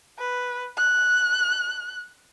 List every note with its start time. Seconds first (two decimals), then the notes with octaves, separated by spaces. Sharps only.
0.19 B4
0.77 F#6